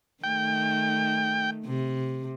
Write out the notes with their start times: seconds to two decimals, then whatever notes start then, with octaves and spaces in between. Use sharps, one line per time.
0.24 D#3 A3 G5
1.66 C3